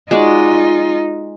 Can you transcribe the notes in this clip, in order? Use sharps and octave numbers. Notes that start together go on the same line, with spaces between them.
G#3 D#4 F4 F#4 D5